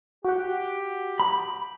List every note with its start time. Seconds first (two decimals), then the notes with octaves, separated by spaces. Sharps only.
0.25 F#4 G4 F#5
1.20 B5